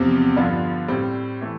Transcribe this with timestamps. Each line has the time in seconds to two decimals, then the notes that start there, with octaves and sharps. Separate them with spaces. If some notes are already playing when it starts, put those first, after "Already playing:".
Already playing: E2 C3 F3 C4 G4
0.36 G2 D3 F3 B3 F4
0.88 A2 G3 C4
1.41 E3 A3